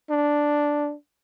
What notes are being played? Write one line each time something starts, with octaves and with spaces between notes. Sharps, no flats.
D4